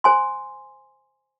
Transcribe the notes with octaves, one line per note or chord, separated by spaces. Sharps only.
C5 G#5 C6